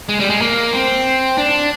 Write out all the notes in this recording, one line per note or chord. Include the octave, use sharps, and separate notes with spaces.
G#3
G3
G#3
A#3
C4
D4